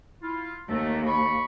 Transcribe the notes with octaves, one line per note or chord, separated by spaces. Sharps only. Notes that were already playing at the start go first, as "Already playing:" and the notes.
E4 F4
D#2 D#3 A3
B5 C#6